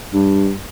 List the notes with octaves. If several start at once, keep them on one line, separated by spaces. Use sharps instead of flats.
G2